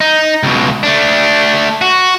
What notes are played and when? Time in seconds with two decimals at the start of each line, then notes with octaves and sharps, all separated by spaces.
0.01 D#4
0.43 C#2 B2
0.83 A3 D4
1.82 F#4